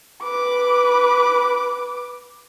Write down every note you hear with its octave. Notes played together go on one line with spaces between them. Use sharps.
B4 D6